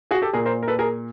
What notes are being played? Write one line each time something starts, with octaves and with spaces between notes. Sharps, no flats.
F#4 G#4
G4 A4
A#2 G#4 A#4
A#4 C5
A#4
A4 B4
G#4 A#4